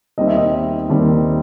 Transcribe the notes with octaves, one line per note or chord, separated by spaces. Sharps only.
D#2 D#3 G3 C4 D#5
E5
D#5
D#2 D#3 G3 C4